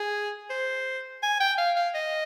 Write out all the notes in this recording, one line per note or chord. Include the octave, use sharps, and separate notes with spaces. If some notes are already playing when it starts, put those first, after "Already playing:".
Already playing: G#4
C5
G#5
G5
F5
F5
D#5